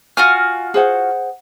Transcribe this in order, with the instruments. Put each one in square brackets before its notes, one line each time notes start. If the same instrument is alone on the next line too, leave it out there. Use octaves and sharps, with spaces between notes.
[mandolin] F4 F#4 F6 [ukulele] G#5
[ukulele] G#4 C5 F#5